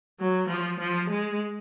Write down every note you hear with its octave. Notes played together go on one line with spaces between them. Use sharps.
F#3
F3
F3
G#3